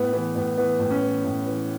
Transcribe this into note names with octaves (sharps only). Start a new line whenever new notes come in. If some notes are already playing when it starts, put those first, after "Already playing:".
Already playing: A2 B3
E3 B3
A2 B3
E3 B3
A2
C#4
E3
A2
E3